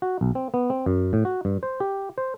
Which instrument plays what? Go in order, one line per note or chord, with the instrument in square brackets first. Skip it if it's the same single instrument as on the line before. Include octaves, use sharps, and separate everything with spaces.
[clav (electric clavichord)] F#4
B1
C4
B3
C4
F#2
A2
F#4
G2
C5
G4
C5